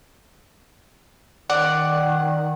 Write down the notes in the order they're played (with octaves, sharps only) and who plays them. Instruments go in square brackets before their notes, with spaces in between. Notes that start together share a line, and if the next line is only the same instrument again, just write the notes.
[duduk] D#3 [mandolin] D5 [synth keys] F#5